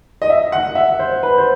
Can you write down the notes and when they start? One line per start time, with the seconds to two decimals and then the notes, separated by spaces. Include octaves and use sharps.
0.22 D#5
0.30 E5
0.52 F#5
0.75 E5
0.99 C5
1.23 B4
1.38 C5